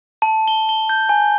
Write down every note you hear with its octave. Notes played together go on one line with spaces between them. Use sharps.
A5
G7
G7
G6
G#5